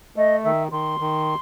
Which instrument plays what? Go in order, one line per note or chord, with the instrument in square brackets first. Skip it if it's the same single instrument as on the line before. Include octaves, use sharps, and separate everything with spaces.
[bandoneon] A3 [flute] D#5
[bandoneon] D#3 [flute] E5
[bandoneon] D#3 [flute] C6
[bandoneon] D#3